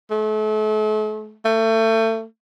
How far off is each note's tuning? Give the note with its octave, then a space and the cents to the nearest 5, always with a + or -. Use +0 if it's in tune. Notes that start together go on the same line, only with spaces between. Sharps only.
A3 -40
A3 +30